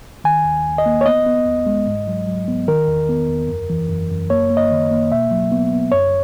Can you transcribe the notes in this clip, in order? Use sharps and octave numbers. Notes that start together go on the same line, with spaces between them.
D#3 G#5
D#2
D#2
D#5
A#3
C#5
B3 D#5
B3
D#2
G#3
G#2
F#3
F#3
B3
D#3 A#4
E2
B3
E2
F#2
E3
F#2
F#2
A#3 C#5
A#3
D#5
D#3
A#3
B2 E5
F#3
B3
B3
F#2 C#5